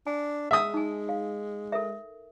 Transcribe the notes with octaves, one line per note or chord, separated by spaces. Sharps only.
D4 G#5
G#3 E5 D#6
D#4 G#5
F5
A4 A#4 E5